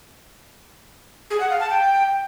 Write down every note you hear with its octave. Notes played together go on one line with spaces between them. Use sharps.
G#4
F#5
F5
A5
G5